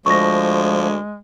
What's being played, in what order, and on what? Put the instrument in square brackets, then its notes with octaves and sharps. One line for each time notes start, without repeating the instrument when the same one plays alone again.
[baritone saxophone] D2 [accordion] F3 [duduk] G#3 [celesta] C#6 A#6